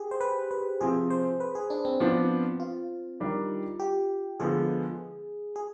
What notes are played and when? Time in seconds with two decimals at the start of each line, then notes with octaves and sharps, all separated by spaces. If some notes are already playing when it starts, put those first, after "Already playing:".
Already playing: G4 G#4
0.11 C5
0.21 B4
0.51 B4
0.81 C3 F3 C4 G#4
1.11 C5
1.40 B4
1.55 G#4
1.70 D4
1.85 C4
2.00 F3 B3 C4 D4
2.60 F4
3.20 D#3 G3 D4 G4
3.80 G4
4.40 D3 F3 G#3 B3 G#4
5.56 G#4